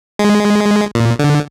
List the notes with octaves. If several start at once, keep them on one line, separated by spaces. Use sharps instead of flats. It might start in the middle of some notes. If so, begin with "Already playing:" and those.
G#3
A#2
D3